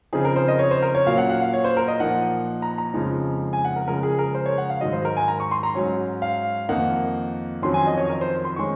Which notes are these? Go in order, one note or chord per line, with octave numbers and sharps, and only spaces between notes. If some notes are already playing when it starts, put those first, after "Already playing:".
C#3 F3 C4 D#4 G#4
A#4
C5
D#5
C#5
C5
A#4
C#5
A#2 F#3 C#4 F5
F#5
F#5
F5
C#5
C5
A#4
D#5
A#2 F3 A#3 D#4 F#5
A#5
A#5
F2 C#3 F3 G#3 D#4
G#5
F#5
A#4
C#3 F3 G#3 A#4
G#4
A#4
C5
C#5
F#5
F5
G#2 D#3 F#3 D#5
C5
A#4
G#5
A#5
C#6
C6
A#5
G#2 F#3 C#4
F5
F2 D#3 A#3 D#4 F#5
F2 D#3 F#3 C#4 C6
G#5
D#5
C#5
A#4
C5
C6
D#3 G#3 C#4 C#6